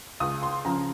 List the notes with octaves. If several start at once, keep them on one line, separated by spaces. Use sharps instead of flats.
C#2 D#6
C6
C#3 F3 A#5